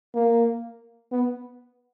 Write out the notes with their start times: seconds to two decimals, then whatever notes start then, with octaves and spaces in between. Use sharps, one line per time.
0.14 A#3
1.12 B3